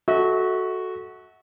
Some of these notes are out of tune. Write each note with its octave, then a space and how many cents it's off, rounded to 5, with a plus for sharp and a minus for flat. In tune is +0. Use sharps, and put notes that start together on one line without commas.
F#4 +0 A4 -10 E5 -40